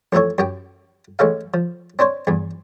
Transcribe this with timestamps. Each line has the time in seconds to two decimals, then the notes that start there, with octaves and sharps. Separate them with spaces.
0.12 A1 F2 E3 A4 C#5
0.38 F#2 G4 G5
1.19 A1 G#3 C#4 A4 F5
1.54 F3
1.99 C4 D4 C5 C#5
2.27 E2 G2